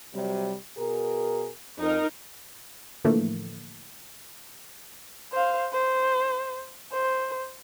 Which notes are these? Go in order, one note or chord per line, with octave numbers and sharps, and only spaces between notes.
C3 F#3 G3
B2 G#4 A#4
F2 D#4 A#4
A2 D3 E3 F3 A3 A#3
C5 F5
C5
C5